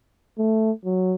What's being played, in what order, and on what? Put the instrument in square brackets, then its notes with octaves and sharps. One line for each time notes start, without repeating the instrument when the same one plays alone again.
[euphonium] A3
F#3